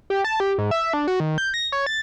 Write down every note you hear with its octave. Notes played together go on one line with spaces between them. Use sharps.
G4
A5
G4
G#2
E5
D4
F#4
D#3
G6
A#6
C#5
A6